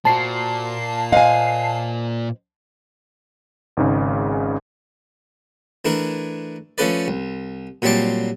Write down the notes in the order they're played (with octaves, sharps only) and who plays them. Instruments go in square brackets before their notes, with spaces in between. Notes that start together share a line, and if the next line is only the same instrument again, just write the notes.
[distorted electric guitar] A#2 [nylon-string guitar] F#4 C5 [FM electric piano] A5 C7
[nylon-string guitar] C5 D#5 F#5 [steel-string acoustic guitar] F5 G#5
[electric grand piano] G#1 G#2 C#3
[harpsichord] E3 A3 D4 E4 A#4
F3 A3 C#4 A4 B4 D5
C2
A#2 F#3 G3 C4 A5 D6